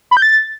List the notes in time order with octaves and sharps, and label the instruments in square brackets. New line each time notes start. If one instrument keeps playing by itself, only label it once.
[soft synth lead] B5
G6
A6